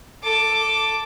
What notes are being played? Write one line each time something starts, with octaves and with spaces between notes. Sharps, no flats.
A4 D6